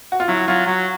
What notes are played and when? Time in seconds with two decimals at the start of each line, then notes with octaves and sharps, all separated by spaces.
0.12 F#4
0.20 F4
0.28 F#3 E4
0.48 F#3 F4
0.67 F#3 F#4